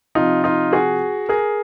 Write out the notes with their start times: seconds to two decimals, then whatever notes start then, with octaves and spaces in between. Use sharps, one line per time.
0.15 C3 F3 D#4 F4
0.44 D#4 F4
0.73 F#4 G#4
1.29 G#4 A#4